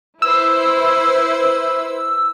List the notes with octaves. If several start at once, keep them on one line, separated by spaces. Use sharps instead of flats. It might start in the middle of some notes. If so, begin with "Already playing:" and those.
E4 B4 C5 E6